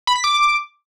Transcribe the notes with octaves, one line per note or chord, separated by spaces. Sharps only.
B5
B6
D6